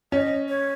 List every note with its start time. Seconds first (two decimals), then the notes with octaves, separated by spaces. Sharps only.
0.12 C#4 D#5
0.49 C#5